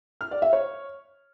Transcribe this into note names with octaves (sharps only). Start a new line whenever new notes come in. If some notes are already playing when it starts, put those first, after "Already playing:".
F6
D5
E5
C#5